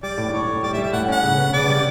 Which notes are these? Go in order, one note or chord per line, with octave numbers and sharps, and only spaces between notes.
G3 D5
A2
A2 C#5
A2
G3 D5
E5
G3
E5
A2 F#5
C#4 F#5
C#3
B3
C#3 D5
G3